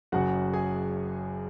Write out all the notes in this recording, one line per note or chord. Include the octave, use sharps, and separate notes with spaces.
F#1 F#2 C#3 F#4 F#5
G#4 G#5